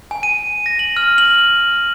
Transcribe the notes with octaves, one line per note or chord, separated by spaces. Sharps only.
G#5
D#7
A#6
F#7
F6
F#7